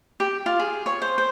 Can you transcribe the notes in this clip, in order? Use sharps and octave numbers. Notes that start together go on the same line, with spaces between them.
G4
F4
G#4
C#5
C5
C5